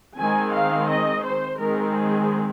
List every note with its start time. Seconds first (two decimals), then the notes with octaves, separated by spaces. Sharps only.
0.17 D#3 G#3 C4 G#5
0.53 F5
0.89 D#5
1.25 C5
1.60 D#3 G#3 C4 A#4
1.97 G#4